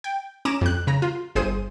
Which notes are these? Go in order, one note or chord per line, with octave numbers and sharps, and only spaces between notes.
G5
C#4 A#5 D6 E7
F2 F#6
C#3 A#5
F4
G1 G#4 C5 D#6 D#7